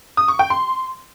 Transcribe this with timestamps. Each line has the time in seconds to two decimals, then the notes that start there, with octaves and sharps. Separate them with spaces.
0.17 D#6
0.28 C#6
0.39 G5
0.50 C6